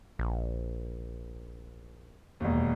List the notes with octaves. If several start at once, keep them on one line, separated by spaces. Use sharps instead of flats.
A#1
E1 D#2